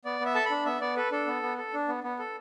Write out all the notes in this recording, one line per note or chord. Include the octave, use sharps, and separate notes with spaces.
B3 D5
B3
E5
A4 A5
D4 B5
B3 E5
B3 D5
A4 B4
D4 A4
B3
B3
A4
D4
B3
B3
A4